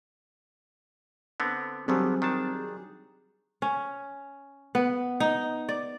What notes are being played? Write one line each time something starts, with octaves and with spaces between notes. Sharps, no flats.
D3 B3 C4
D3 D#3 F#3 G3 B3 C4 G#4
D#3 D4 A5
C#4
B3
D#4
D5